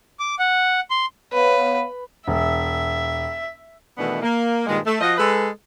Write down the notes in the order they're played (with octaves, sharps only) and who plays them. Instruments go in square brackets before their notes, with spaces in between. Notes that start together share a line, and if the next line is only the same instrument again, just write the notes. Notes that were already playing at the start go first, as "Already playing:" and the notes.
[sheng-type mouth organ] D6
F#5
C6
[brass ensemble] B3 C#5 F5 [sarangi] B4
[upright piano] E1 [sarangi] E5
[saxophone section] B2 D#3 E3 A3 B3 D4
A#3
G2 A#2 D#3 G#3
A3
F3 F4 F#4 D#5
G#3 A4 B4